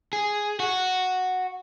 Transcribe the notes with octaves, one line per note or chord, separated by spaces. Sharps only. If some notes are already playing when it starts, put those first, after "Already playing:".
G#4
F#4